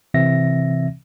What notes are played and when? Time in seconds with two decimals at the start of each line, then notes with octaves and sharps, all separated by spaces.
0.14 C3 E3 C4 E5 A#6